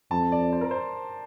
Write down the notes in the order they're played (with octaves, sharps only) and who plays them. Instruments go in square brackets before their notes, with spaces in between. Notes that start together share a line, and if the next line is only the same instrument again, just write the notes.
[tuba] F2 [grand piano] A5
[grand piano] D5
C5
A#4
C5